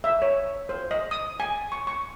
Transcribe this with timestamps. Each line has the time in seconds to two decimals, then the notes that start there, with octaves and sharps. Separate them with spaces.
0.04 E5
0.22 C#5
0.69 C5
0.91 D#5
1.11 D#6
1.40 G#5
1.72 C#6
1.87 C#6